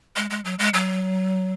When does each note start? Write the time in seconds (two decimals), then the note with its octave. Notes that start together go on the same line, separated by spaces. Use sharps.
0.16 G#3
0.30 G#3
0.45 F#3
0.59 G#3
0.74 F#3